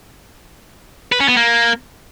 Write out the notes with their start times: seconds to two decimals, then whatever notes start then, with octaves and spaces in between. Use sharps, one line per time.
1.12 B4
1.20 C#4
1.28 B3
1.37 A#3